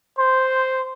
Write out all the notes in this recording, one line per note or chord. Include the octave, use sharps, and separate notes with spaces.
C5